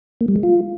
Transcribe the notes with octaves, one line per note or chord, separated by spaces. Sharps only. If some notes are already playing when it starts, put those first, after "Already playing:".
A#3
G3
G#3
F4